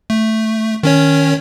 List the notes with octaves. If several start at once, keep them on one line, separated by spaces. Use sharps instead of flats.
A3
D#3 C#4 C#5